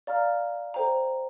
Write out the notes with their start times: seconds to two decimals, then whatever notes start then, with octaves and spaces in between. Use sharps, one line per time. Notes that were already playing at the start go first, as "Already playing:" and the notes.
0.07 D5 F5 A#5 F6
0.74 A4 C5 G5 A#5